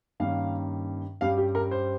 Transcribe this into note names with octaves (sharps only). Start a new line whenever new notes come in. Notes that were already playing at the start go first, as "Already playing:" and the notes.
G2 D#3 A#3 C#4 F5
G2 G3 C#4 F5
G4
A#4
C5